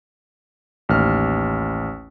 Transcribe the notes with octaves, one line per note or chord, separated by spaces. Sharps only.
A1 D#2 F6